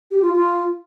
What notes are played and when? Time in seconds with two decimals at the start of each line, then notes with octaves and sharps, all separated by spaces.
0.11 G4
0.22 F4
0.33 F4